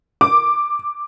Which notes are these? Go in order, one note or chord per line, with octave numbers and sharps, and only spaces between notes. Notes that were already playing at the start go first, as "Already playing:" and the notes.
D6